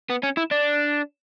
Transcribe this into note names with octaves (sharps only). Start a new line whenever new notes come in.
B3
C#4
E4
D4